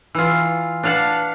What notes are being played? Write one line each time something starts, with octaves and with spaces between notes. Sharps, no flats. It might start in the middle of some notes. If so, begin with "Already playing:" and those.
E3 F4
D4 B4 F5 F#5 A5